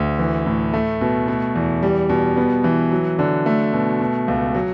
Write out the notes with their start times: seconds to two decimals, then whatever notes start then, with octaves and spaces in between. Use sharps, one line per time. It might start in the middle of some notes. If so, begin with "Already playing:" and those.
Already playing: D2
0.19 E3
0.46 A2
0.74 A3
1.01 B2
1.28 B2
1.55 E2
1.83 G3
2.09 B2
2.37 B3
2.64 E3
2.92 F#3
3.19 D3
3.46 A3
3.73 B2
4.00 B2
4.28 C#2
4.55 F#3